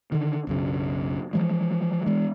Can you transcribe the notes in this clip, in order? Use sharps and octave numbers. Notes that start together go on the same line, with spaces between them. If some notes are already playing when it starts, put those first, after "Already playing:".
D3 D#3
B1 F#2 C#3
E3 F3 G#3
E3 G#3